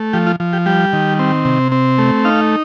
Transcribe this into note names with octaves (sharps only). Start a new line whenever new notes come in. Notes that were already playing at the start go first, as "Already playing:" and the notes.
Already playing: A3
F3 G4
F4
F3
G4
G3 G4
D#3
C4
C3
C4
A3
D#4 F5